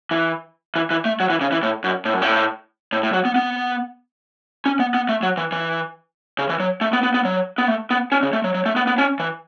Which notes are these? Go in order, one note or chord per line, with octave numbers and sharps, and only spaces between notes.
E3
E3
E3
A3
F#3
E3
C#3
E3
A2
F#2
A2
F#2
A2
A2
A2
F#3
B3
B3
C#4
B3
B3
A3
F#3
E3
E3
C#3
E3
F#3
A3
B3
B3
B3
F#3
B3
A3
B3
C#4
C#3
A3
F#3
F#3
A3
B3
B3
C#4
E3